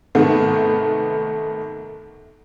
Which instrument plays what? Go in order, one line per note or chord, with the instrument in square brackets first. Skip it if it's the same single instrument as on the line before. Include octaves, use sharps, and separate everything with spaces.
[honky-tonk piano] G#2 C3 D#3 A3 B3